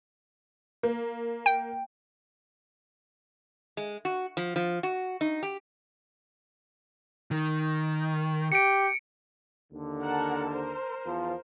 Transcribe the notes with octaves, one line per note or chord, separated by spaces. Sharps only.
A#3
G5
G#3
F#4
F3
F3
F#4
D#4
G4
D#3
G4 C#7 D7
D#2 D3
A#4 F#5 A5
A#4 C5
E2 F3